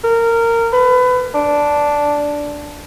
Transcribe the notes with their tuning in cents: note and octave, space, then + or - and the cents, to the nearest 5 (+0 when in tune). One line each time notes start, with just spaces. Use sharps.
A#4 -15
B4 +25
D4 -5